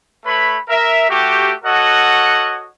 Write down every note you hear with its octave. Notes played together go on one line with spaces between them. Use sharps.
A3 B4 C#5 B5
A#4 E5
A3 F#4 G4
F#4 A4 C#5 D#5 F#5